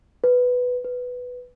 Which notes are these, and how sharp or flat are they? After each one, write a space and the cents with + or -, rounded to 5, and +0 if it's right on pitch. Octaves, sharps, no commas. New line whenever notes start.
B4 +5
B4 +5